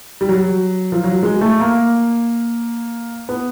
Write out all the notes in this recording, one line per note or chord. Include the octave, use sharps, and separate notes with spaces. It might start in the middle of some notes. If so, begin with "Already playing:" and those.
G3
F#3
F3
F#3
G#3
A3
A#3
B3